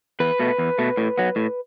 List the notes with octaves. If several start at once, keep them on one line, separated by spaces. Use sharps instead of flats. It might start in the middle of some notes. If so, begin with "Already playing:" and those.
E2 B4
B2 A3
E2
B2 A3
A2
F#3 B3
A2